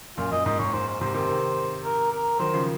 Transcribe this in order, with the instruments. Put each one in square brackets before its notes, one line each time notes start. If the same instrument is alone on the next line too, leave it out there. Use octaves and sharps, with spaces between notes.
[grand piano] F#2 A#2 [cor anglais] F4
[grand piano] F#2 [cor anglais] D#5
[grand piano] G#2 [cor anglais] D#5
[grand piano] G#2 [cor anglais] C#5
[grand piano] G#2 [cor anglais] C5
[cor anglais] C5
[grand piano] G#2 C3 [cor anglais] C5
[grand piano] C3 D#3 [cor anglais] C5
[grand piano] C3 D#3
[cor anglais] A#4
A#4
[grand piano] D#3 F#3 [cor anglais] C5
[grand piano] C#3 F3